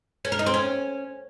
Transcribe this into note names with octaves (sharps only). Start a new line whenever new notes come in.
C#4
A#4
D#4
C4
C#4